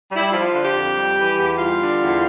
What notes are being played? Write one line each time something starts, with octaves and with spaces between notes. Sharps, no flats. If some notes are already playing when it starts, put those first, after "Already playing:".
G3
E4
F3 F4
D3
G4
F2
G3
E3
E2
G3 F4
D3
E2